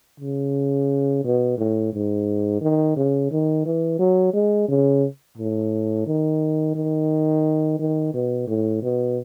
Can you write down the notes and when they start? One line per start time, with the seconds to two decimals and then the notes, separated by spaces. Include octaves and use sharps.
0.20 C#3
1.25 B2
1.58 A2
1.93 G#2
2.61 D#3
2.96 C#3
3.31 D#3
3.66 E3
3.99 F#3
4.34 G#3
4.69 C#3
5.38 A2
6.06 D#3
6.75 D#3
7.79 D#3
8.14 B2
8.48 A2
8.83 B2